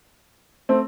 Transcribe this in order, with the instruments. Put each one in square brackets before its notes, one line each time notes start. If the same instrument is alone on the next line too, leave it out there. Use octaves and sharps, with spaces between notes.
[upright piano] A3 C4